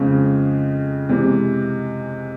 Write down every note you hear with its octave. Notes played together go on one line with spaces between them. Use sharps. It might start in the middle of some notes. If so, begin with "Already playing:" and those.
Already playing: F2 C#3 F3 G#3 C#4
C3 E3 G#3